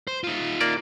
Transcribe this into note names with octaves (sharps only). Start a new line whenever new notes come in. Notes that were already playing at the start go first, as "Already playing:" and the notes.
C5
D#4 F4
A#3 D5